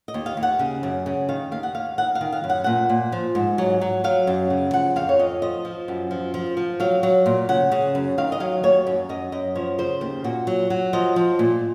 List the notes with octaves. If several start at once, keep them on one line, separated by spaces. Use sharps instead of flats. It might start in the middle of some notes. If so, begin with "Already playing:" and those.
D#5
D#2
F5
D#2
F#5
C#3
F#2
C#3
D#3 F5
D#2 F5
F#5
D#2 F5
D#3 F#5
F5
D#3
F5
F#2
F#5
A#2 F#5
A#2
F3
G#2
F#3
F#3
F#3 F5
F#2
C#3
F3 F#5
F2 F5
C#5
F2 D#5
F3 D#5
F3
F#2
F3
F3
F3
F#3 F5
F#3
A#2
C#3 F#5
C#3
F#2
D#3 F5
D#5
F#3 F5
D#2 C#5
F#2
F#2 D#5
F#2 D#5
F3 C#5
C#3 C5
D#2 C5
A#2 F#4
F#3
F#3
F3 D#5
F3
A#2